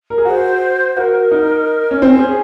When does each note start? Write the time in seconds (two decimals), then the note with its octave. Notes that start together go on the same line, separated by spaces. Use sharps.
0.10 A#4
0.18 G#4
0.25 F#4 C5
0.96 F#4 A#4
1.31 D#4
1.91 C#4
2.02 C4 C#4
2.19 G#4